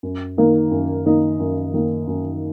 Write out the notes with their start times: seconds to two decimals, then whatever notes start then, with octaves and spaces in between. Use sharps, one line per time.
0.03 F#2
0.37 D#3 A#3 D#4
0.72 F#2
1.06 D#3 A#3 D#4
1.40 F#2
1.74 D#3 A#3 D#4
2.07 F#2